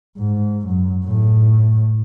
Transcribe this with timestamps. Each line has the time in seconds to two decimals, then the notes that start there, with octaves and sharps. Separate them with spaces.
0.18 G#2
0.67 F#2
1.07 A2